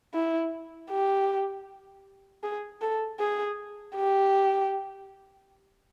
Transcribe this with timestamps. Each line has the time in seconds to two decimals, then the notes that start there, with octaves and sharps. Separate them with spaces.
0.14 E4
0.90 G4
2.44 G#4
2.81 A4
3.20 G#4
3.97 G4